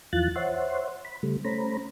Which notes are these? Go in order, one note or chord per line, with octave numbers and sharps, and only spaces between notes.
E2 E3 F3 F4 F#6 A6
C5 C#5 E5 F#5 C6
B5
C#3 G3 A3
A3 C#4 C5 A#5 B5